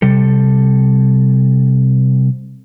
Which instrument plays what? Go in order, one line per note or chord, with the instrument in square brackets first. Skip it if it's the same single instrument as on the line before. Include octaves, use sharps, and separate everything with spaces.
[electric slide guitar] C3 G3 A4